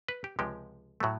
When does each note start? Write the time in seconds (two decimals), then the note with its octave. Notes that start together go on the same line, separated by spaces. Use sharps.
0.08 B4
0.24 G4
0.39 C#2 C3 F3 G#3 G4
1.00 A2 F#3 A3